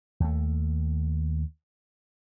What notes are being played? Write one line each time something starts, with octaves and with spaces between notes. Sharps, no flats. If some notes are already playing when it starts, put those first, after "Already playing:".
D#2 A3